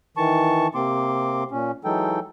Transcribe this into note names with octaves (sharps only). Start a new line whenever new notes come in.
D#3 E3 A5 C#6
C3 A#3 C4 C6 D6
A#2 C#4
E3 F#3 G#3 D#4 A4 G5